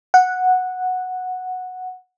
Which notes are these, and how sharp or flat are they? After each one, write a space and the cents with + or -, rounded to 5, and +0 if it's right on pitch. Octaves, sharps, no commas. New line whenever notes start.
F#5 -5